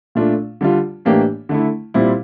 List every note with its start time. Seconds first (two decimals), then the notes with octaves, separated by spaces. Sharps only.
0.15 A#2 A3 D4 F4
0.61 D3 G3 D4 F4
1.05 A2 E3 A#3 D4 G4
1.49 D3 A3 E4
1.94 A#2 G3 C4 E4